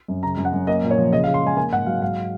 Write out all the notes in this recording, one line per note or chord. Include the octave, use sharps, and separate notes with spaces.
F#2
C#3 A#5
F#2
F#5
F#2
A#3 D#5
A#2
C#5
F3
C#3 D#5
F5
C#3
C6
G#3 G#5
A#3 G#5
G#2 F#5
F#3 F5
G#2 F5